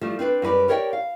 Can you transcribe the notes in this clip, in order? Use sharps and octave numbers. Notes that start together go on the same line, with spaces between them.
F3 G3 A3
C4 D4 B4 D5
F#2 G3 B4 D5
G4 A#4 C#5 D5 E5 G5
F5